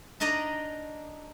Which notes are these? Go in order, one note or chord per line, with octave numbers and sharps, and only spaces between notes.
D4 D#4 D5 D#5 A#5